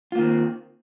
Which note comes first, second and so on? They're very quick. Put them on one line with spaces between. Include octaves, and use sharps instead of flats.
F4 A#3 D#3 C4